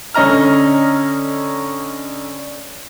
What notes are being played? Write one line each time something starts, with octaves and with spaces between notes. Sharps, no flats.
D3 C#4 D#5 A#5 F6